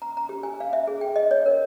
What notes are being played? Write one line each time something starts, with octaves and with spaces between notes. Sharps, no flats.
A#5
A#5
G4
G#5
F5
E5
G#4
G5
D#5
C#5
A#4